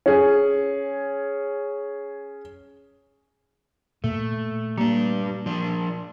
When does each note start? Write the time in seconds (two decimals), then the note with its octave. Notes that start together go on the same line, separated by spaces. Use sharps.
0.06 C#4 G#4
4.04 A#2 A3
4.78 G3 A#3 D4
5.46 F3 D4